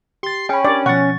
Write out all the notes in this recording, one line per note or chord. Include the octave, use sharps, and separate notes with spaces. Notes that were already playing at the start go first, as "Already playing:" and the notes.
G4 C6 A6
C#4 G#4 G5 B5
D4 G4 A#4 D5
B2 F3 F#5 C#6 A6